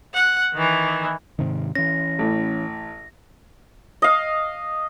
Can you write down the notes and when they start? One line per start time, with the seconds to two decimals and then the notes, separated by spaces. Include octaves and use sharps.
0.14 F#5
0.54 D#3 E3
1.39 G#2 C3 D#3
1.75 E3 C#4 A#6
2.19 A1 A2
4.02 D#5 F5